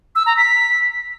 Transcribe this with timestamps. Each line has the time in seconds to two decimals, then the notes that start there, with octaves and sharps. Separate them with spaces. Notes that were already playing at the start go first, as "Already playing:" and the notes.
0.15 E6
0.26 A#5
0.37 B6